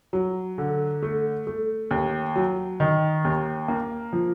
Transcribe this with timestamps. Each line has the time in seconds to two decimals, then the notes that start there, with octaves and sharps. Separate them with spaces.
0.13 F#3
0.58 D3
1.03 A3
1.47 A3
1.91 D#2
2.36 F#3
2.80 D#3
3.25 D#2
3.68 A#3
4.13 F3